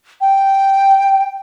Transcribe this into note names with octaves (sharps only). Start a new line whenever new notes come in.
G5